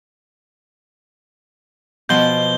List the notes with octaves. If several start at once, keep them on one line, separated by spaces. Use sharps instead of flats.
B2 F3 G6 G7